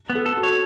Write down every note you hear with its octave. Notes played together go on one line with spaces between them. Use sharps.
B3
A4
A4
F#4
C#5